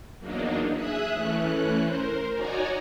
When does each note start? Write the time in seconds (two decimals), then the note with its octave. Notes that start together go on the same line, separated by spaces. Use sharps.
0.18 E2 F#3 A#3 D4 D#4
0.72 G#4 E5 D#6 F#6
1.12 E3 A3 C#4 F#6
1.79 A#4 C5
2.33 D#4 F#4 C#5 D5 G#5 A#5